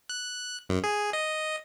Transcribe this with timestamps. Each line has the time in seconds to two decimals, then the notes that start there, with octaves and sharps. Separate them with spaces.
0.10 F#6
0.69 F#2
0.84 G#4
1.13 D#5